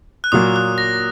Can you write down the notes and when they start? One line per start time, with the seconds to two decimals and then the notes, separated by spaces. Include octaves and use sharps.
0.24 F#6
0.32 A#2 F#3 A#3 D#6
0.56 F#6
0.78 A#6